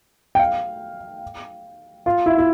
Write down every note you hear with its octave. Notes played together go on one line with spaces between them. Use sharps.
G5
F5
F4
E4
E4